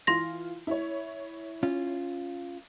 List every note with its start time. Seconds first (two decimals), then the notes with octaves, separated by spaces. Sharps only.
0.07 E3 F4 C6 A#6
0.67 E4 C#5
1.63 C#4 F4